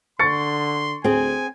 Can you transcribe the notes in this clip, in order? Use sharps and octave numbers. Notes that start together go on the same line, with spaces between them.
D3 C6 C#6 A6 C#7
D2 C4 G#4 G#5